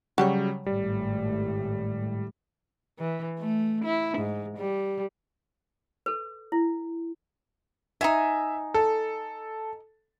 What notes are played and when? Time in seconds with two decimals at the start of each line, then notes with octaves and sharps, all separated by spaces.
0.18 C#3 F#3 G3 F#4 G4 C#5
0.66 G#1 A2 G3
2.99 E3
3.39 A3
3.85 E4
4.18 G#2
4.58 G3
6.06 A4 B4
6.52 E4
8.01 D#4 F4 E5 G#5
8.74 A4